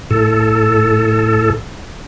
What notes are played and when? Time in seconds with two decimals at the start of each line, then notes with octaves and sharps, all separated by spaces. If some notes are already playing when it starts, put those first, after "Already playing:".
0.11 A2 A4